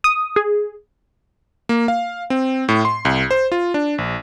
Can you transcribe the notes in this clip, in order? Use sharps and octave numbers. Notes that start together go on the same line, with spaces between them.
D#6
G#4
A#3
F5
C4
A2
C6
C2
C5
F4
D4
A#1